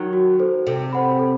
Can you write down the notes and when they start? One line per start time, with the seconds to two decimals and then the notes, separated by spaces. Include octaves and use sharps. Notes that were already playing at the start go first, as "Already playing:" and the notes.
Already playing: D#3 F#3
0.13 F#4
0.39 A4 C5
0.67 C3 A4
0.93 C5 F#5 B5
1.19 A4